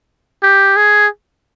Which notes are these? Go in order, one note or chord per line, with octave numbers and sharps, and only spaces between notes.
G4
G#4